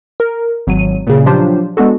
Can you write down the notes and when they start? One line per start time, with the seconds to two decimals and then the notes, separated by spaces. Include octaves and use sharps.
0.20 A#4
0.67 G#1 F#3 D#7
1.07 A#2 C#3
1.26 F3 F#3 D4 F4 G4 C5
1.77 G#3 B3 D4 F#4 A4